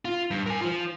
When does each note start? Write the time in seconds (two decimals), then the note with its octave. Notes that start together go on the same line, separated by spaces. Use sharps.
0.05 F4
0.31 G2
0.46 A#4 G#5
0.61 F4 C5